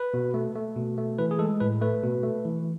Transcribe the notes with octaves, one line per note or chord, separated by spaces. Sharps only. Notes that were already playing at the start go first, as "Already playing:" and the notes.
Already playing: B4
B2
A3
A3
B2
A3
E3 B4
G#4
G#3 A4
A2 B4
A3 B4
B2
A3
E3